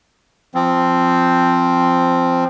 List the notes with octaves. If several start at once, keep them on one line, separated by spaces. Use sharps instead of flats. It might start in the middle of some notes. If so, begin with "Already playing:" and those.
F3 C4